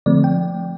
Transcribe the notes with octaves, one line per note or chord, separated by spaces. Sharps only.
D3 F3 A3 C4 D5
G5